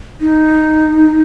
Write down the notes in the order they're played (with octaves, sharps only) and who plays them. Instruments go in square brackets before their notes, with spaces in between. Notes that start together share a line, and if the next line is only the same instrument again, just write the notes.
[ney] D#4